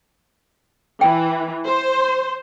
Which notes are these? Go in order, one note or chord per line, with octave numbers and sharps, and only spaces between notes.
E3 G5
C5